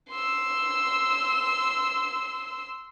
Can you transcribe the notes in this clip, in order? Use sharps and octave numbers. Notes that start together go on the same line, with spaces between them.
C6 E6